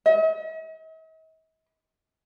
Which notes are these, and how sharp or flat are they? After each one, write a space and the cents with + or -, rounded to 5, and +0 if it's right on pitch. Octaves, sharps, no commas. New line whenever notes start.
D#5 +45